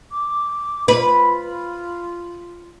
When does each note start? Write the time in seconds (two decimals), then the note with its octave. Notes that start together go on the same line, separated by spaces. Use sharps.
0.11 D6
0.88 F4 B4